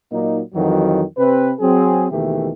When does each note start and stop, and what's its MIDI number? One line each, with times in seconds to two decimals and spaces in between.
0.11 0.40 46
0.11 0.40 54
0.11 0.40 58
0.11 0.40 63
0.54 1.02 41
0.54 1.02 51
0.54 1.02 52
0.54 1.02 54
1.17 1.52 48
1.17 1.52 60
1.17 1.52 71
1.60 2.06 54
1.60 2.06 60
1.60 2.06 68
2.12 2.50 39
2.12 2.50 47
2.12 2.50 51
2.12 2.50 52
2.12 2.50 57
2.12 2.50 67